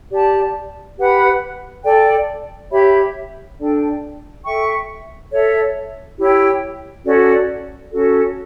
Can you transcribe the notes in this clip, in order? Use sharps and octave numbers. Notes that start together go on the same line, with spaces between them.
G4 D5 A5
G4 B4 F#5 B5
A4 D5 G5
G4 C#5 E5 B5
D4 A4 D5 G5
A4 E5 G5 C#6
A4 C#5 E5
E4 G4 C#5 G5
C#4 F#4 A4 D5
C#4 F#4 A4